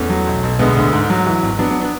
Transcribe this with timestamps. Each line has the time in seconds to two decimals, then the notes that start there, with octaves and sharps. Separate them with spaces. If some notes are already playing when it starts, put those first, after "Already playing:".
Already playing: E2 A3 C#4
0.10 F#3
0.27 B1
0.43 B1
0.59 D2 G#3 B3
0.77 D2
0.93 G#2
1.10 F#3
1.26 E3
1.43 G#1
1.59 F#3 B3 D4
1.70 B3 D4
1.81 B3 D4